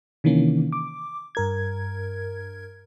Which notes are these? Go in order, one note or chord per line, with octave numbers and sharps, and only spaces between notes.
C3 D#3 E3 A#3 C#4
D6
G2 A#4 G#6